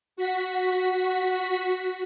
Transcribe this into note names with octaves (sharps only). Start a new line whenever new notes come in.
F#4 B6